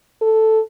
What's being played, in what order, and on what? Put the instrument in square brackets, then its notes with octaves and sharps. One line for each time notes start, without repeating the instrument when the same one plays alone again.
[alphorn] A4